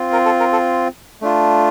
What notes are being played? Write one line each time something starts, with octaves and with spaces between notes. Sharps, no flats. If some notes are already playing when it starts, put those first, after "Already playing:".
Already playing: C4 F4
A#4
A4
A#4
A4
A3 D4 F4